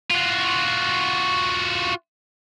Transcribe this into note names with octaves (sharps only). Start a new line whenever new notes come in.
F4 F#4